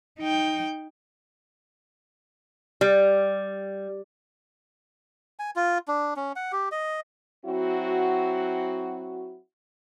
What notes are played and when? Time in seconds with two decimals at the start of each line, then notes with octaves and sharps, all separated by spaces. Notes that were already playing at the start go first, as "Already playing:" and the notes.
0.19 D#4 G5
2.81 G3
5.39 G#5
5.56 F4
5.88 D4
6.16 C#4
6.36 F#5
6.52 G4
6.72 D#5
7.45 F#3 C4 E4 F#4